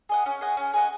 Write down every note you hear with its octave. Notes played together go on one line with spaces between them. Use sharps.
G#4 D#5 F#5
C#4
G#4 D#5 F#5
C#4
G#4 D#5 F#5